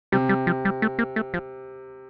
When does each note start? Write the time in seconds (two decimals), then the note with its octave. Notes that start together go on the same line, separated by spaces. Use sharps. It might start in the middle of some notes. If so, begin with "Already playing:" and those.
0.12 C3 G3
0.29 G3
0.47 F3
0.65 G3
0.82 A3
0.99 A#3
1.16 A3
1.34 F3